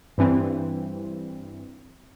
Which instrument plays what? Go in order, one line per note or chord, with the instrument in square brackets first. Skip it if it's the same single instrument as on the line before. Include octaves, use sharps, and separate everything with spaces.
[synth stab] G2 E3 C4